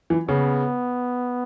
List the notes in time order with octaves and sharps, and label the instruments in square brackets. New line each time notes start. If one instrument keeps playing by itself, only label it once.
[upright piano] E3
[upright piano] C#3 [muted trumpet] B3